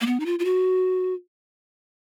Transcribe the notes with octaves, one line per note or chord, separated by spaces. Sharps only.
A#3
B3
D#4
F4
F4
F#4